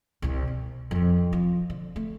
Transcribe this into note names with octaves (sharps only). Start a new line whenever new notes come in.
C2 C3
B2
F2 D3
F3
D3
A3